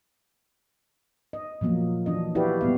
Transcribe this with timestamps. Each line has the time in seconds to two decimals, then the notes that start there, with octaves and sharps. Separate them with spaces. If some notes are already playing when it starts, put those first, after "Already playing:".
1.33 D#5
1.61 A#2 F3 F#3 A#3
2.06 E3 F#3 D4 D#5
2.35 E4 F#4 G4 B4 D5 F5
2.61 A#2 G3 B3 F5